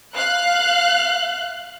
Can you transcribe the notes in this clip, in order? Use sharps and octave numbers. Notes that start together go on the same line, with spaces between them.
F5 F#6